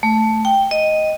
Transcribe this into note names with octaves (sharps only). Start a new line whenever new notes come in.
A3
G5
D#5